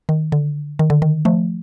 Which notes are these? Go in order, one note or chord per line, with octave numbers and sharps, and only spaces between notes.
D#3
D3
D#3
D3
D#3
F3 A3